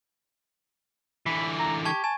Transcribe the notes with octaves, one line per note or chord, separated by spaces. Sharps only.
D3 E3 B5
A#5
G4 A5 C#6 G#6
G#5 A5